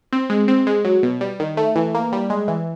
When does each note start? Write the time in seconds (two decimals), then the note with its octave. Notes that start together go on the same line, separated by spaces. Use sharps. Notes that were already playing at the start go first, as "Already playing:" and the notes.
0.13 C4
0.30 G#3
0.48 C4
0.67 G#3
0.85 F#3
1.03 B2
1.21 G3
1.40 D#3
1.57 A3
1.76 E3
1.95 A#3
2.12 G3
2.30 G#3
2.48 E3